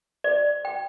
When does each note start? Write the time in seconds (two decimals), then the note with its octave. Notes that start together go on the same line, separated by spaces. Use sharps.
0.24 D5
0.65 G5